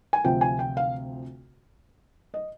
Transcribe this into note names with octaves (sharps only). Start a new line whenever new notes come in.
G#5
D2 C3 F3 C4 F4 G5
G#5
G5
F5
D#5